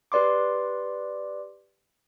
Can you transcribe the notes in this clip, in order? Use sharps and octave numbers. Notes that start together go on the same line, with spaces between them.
G4 B4 D5 C6 D6